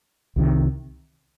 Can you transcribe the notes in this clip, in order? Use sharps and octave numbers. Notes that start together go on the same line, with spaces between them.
C2 C3 D#3